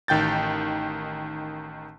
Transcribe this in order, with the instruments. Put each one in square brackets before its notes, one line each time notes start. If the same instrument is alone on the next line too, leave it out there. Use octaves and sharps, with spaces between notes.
[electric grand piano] A1 D#3 G5 G6 A6